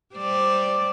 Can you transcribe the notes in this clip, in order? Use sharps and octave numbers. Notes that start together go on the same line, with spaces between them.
G3 C5 D5